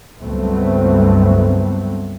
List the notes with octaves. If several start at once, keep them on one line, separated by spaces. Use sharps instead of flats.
C#2 G2 F#3 A3 B3 C4